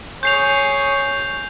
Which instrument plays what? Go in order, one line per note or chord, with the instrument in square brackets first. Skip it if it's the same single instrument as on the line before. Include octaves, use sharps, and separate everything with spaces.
[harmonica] G#4 C#5 [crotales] G6 C7 F7